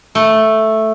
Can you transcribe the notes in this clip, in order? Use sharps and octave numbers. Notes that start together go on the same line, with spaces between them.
A3